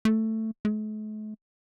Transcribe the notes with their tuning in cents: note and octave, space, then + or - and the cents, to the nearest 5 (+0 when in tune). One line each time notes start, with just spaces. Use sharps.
A3 +10
A3 -45